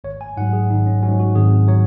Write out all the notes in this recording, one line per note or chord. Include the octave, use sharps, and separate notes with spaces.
G#1 C#5
G#5
G#2 F#3 F#5
G#4
G#1 D#4
C#4
G#2 F#3 C#4
F#4
G#1 G#4
F#3 C#5